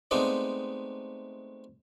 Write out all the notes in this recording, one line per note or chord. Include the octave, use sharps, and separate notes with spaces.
G#3 A3 B3 C4 D#4 D5